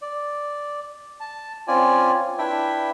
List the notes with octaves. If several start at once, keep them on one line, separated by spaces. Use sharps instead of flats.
D5
A5
C4 C#4 F4 D5 G#5
D4 E4 B4 E5 G5